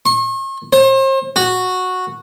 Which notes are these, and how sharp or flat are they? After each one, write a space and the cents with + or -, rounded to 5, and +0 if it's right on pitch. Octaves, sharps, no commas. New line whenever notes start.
C#6 -45
C5 +40
F#4 -10